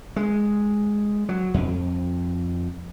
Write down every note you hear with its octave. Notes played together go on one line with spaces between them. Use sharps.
G#3
F#3
F2